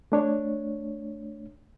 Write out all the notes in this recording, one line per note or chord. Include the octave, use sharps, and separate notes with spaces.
A3 D4 C#5